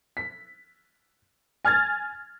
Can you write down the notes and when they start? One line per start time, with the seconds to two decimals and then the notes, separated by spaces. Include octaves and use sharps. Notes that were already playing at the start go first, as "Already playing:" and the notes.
0.17 B6
1.65 G#5 F6 G#6 A6